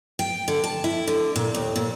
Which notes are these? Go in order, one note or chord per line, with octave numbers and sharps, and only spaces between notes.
G5
D3
A5
E4
D3
A#2
D#2
A#2